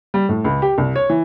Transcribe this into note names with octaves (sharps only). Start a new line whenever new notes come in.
G3
A2
C#2
G4
C2
C#5
E3